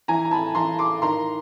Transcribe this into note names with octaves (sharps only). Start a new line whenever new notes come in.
E3 G#5 A#5
A#5
A5 B5
E3 A#5 C6
C6 D6
D#3 A#5 C6